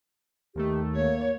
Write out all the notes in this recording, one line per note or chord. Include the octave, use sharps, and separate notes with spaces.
D#2 D#3 A3 G4
A#3 C#5